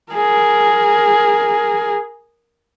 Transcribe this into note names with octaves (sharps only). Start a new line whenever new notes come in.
G#4 A#4